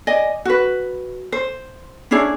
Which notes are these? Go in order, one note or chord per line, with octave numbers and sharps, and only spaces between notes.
D5 D#5 G#5
F#4 B4
C5
C#4 D4 E4 G#4